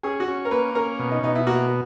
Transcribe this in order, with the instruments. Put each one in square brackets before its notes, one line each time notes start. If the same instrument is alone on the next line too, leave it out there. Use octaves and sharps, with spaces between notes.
[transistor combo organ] C#4 [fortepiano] G#4
[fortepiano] F#4
[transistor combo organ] C#4
[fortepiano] A#4
[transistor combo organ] A#3 [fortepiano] B4
[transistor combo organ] C#4 [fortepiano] A#4
[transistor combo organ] B2
[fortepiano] D#4
[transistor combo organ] B2 [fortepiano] D#4
[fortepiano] E4
[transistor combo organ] A#3 [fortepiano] F#4